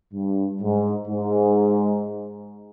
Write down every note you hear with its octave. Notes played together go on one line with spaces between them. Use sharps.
G2
G#2
G#2